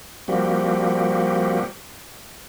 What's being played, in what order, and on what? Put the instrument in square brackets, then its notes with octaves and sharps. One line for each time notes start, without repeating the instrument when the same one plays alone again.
[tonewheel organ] F3 G3 A#3 C4 F#4 G4